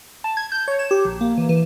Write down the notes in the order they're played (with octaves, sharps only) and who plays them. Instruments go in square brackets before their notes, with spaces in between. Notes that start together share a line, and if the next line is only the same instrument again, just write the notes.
[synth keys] A5
G#6
G6
C#5
E7
G4
A#1
A#3
E3
E3